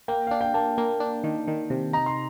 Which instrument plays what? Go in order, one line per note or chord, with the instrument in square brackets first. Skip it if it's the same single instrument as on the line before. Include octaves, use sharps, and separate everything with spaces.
[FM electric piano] A#3 [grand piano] G5
[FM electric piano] D4 [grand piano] F5
[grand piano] G5
[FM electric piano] A#3 [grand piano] A5
[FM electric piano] A#3
D4
D#3
D#3
C3
[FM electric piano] D#4 [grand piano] A#5
[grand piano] C6